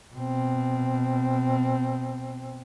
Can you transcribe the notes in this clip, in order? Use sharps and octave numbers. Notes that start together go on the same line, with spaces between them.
B2 C4